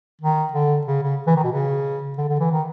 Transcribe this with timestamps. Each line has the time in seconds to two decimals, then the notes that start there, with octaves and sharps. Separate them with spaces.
0.21 D#3
0.53 D3
0.87 C#3
1.03 C#3
1.27 E3
1.36 D#3
1.44 B2
1.52 C#3
2.18 D3
2.29 D3
2.40 E3
2.51 D#3